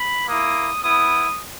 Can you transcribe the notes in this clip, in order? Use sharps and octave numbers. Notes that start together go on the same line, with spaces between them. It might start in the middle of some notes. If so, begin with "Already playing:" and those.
Already playing: B5
A#3 E4 D#6
B3 E4 D#6